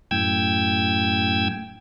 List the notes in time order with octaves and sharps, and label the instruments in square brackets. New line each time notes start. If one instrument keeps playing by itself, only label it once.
[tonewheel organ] F#2 A2 G5 E6 G#6